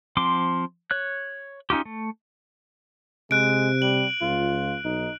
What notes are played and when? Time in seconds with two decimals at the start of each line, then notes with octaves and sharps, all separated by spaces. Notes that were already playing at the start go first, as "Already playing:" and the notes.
0.17 F3 C4 C6 D6
0.91 C#5 F#6
1.70 C#4 D#4 F4 G4
1.85 A3
3.31 C3 G#3 F#6 D7
3.82 G3 F#7
4.21 C#2 F4
4.85 B1 D#4